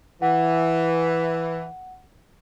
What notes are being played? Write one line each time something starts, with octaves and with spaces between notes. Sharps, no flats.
E3 F#5